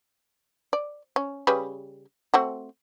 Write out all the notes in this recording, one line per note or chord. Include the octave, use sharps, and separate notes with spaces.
D5
C#4
C#3 G3 B4
A3 C4 F#4